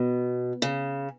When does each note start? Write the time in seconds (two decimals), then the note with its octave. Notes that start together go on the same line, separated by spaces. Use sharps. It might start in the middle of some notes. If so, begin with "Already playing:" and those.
Already playing: B2
0.62 C#3